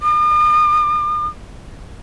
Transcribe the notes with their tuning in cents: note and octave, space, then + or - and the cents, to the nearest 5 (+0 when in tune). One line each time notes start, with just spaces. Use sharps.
D#6 -45